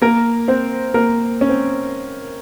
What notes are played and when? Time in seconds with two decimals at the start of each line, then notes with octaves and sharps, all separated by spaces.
0.02 A#3 A#4
0.48 C4 C5
0.94 A#3 A#4
1.41 C#4
1.49 C4